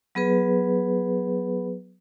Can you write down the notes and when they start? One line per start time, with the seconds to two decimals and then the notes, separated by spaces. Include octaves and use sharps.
0.15 F#3 B3 G#4 B4